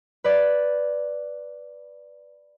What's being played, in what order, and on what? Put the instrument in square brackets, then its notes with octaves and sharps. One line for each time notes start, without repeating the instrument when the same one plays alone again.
[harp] B4 D5